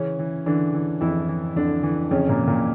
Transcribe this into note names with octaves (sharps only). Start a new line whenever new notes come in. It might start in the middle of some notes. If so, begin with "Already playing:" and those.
Already playing: C#3 E3 C#4
E3
D3 E3 D4
E3
F2 E3 E4
E3
F2 D3 D4
E3
F2 C#3 C#4
A#2 A#3
E3
A#2 A#3